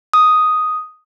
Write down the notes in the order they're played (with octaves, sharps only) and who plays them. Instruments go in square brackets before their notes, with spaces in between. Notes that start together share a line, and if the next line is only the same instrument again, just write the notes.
[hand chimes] D#6